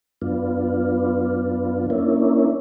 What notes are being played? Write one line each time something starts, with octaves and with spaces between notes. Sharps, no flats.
F#2 B3 D4 F4
A#3 C#4 D4 E4